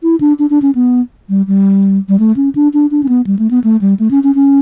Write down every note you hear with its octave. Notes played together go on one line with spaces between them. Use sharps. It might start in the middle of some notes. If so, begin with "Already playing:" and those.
E4
D4
D4
D4
C#4
B3
G3
G3
G3
A3
C#4
D4
D4
D4
C#4
B3
G3
A3
B3
A3
G3
A3
C#4
C#4
C#4